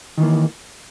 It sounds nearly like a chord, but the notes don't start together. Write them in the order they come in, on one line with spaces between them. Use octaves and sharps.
D#3 E3 A#3